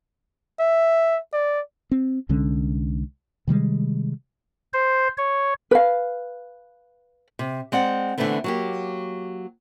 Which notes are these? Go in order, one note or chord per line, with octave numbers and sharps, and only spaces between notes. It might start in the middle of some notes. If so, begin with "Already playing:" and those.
E5
D5
C4
C2 D3 G#3 C#4
C3 D#3 G3 G#3
C5
C#5
B4 F5
C3
G#3 C4 D5 F#5
D3 E3 G#3 A3 B3 C4
F#3 A#3 G4